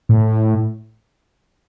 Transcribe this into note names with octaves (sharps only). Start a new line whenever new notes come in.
A2